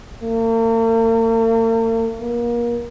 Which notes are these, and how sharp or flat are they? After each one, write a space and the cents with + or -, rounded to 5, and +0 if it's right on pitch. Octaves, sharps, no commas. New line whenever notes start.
A#3 -45
A#3 +30